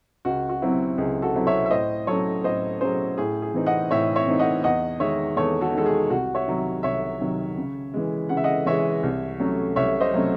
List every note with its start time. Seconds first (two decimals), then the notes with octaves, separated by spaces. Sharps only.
0.25 C#2 F#4
0.49 F#4
0.62 C3 F#3 C4 E4
0.98 C#2 G#4
1.22 F#4 A4
1.35 C3 F#3 C4 E4
1.47 C#5 E5
1.66 E5
1.71 A2 C5 D#5
2.07 F#3 C#4 A4 C#5
2.44 A2 C5 D#5
2.81 F#3 C#4 G#4 C5
3.18 A2 G#4
3.42 G#4
3.54 E3 C4 D#4
3.66 D#5 F#5
3.91 A2 C#5 E5
4.15 C#5 E5
4.27 E3 C4 D#4
4.39 D#5 F#5
4.64 E2 D#5 F#5
5.00 D#3 G#3 C#5 E5
5.37 E2 A4 C#5
5.61 F#4 A4
5.74 D#3 G#3 A4
5.86 G#4
6.10 C2 F#4
6.35 C#5 E5
6.47 C3 D#3 F#3
6.83 C2 C#5 E5
7.20 C3 D#3 F#3
7.57 C#3
7.94 E3 G#3
8.29 C#3 F#5
8.37 E5
8.44 D#5 F#5
8.66 E3 G#3 C#5 E5
9.03 C2
9.40 C3 F#3 A3 C#4
9.76 C2 C#5 E5
10.01 C5 D#5
10.13 C3 F#3 A3 C#4